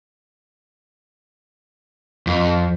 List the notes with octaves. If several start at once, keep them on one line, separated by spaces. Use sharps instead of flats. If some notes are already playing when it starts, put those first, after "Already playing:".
F2